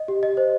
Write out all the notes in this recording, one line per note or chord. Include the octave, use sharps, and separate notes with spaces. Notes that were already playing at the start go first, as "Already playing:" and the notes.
Already playing: D#5
G4
D#5
C5